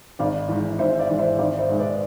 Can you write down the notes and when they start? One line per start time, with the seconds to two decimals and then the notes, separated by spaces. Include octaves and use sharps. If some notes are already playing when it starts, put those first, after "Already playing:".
0.19 G#1 D5 F5
0.49 G#2 E3
0.79 G#1 C5 E5
0.99 D5 F5
1.09 G#2 E3
1.19 C5 E5
1.39 G#1 D5 F5
1.59 C5 E5
1.69 G#2 G#3
1.79 B4 D5